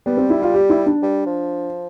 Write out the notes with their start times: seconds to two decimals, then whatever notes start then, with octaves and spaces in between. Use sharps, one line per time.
0.06 G3 B3
0.17 C4
0.30 E4
0.42 F4
0.54 G4
0.70 E4
0.86 D4
1.03 G3
1.26 F3